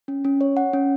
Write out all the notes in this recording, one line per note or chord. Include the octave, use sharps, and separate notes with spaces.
C#4
C#4
C#5
F#5
C#4